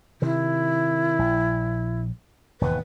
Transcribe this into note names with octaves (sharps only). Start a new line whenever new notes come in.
C3 D#3 E4
A#1
E1 D#2 G#2 B4